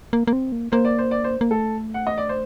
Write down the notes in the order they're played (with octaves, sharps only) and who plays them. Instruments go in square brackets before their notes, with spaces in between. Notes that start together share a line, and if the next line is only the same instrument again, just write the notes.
[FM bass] A#3
A#3
C4
A#3
[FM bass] A#3 [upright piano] C5
[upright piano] D5
C5
D5
C5
[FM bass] A#3
[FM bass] A3 [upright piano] A4
[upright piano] F#5
D#5
D5
C5